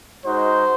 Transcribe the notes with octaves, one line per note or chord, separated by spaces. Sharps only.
G#3 D#4 F#4 C5